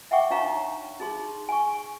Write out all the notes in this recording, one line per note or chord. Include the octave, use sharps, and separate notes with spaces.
E5 F#5 G5 C#6 D6
D4 D#4 C#5 F5 A#5 C#6
D#4 G#4 C6
G#5 C#6